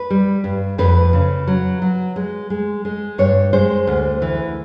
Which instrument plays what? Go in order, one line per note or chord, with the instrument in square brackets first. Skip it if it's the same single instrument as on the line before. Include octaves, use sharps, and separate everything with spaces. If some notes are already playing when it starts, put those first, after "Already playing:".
Already playing: [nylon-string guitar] B4
G3
G2
F2 B4
C#3
F#3
F#3
G#3
G#3
G#3
G2 C#5
G#3 C5
D2
E3